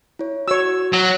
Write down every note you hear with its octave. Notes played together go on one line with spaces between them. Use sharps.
E4 C#5
F#4 C#5 E6
F#3